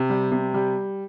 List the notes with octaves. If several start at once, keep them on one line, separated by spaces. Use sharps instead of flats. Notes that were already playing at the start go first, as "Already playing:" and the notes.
Already playing: C3
G3
C3
G3